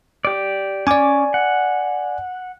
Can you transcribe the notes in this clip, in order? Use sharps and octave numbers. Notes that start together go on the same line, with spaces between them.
G4 D5
C#4 D5 G#5 D6
F#5